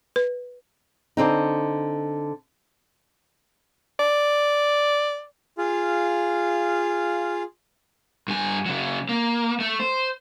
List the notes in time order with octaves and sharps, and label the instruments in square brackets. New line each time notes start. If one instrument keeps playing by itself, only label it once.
[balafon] B4
[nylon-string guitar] D3 C4 D#4
[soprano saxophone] D5
[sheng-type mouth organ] F4 G#4 F5
[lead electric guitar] G2 G#5
C#3 F#3
A#3
A3
C5